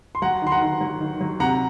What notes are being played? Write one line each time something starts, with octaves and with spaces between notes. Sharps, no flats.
C6
F#3 F#5 A#5
D#3 C6
F#5 A#5
D#3
F#3
D#3
F#3
C3 F#5 A#5